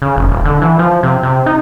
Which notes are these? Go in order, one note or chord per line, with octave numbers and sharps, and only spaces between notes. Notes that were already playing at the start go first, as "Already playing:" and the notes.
C#3
F1
D#1
D3
E3
F3
C3
C3
D#4